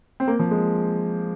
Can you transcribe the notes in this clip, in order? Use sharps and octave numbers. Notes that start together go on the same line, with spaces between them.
C4
A#3
F3
G#3